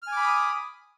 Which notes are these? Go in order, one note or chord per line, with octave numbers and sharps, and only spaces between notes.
G#5 B5 D6 D#6 F6